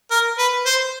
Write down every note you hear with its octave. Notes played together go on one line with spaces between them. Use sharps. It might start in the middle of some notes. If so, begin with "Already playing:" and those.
A#4
B4
C5